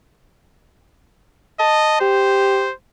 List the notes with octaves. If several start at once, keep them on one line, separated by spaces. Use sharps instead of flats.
D#5 A5
G4 C5